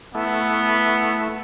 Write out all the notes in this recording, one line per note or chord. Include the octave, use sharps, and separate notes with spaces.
A3 B3 E4